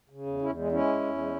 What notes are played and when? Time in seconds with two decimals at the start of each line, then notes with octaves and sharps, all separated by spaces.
0.10 C#3
0.26 E2
0.41 E2 C#4 E4
0.57 G#3
0.72 G#3 C#4 E4
0.87 E2
1.03 E2
1.18 G#3